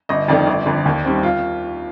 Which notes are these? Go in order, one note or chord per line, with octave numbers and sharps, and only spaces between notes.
G1 D#5
F2 D#3 A3 D5
G1
F2 D3
D#2
D#3 G3 C4
F4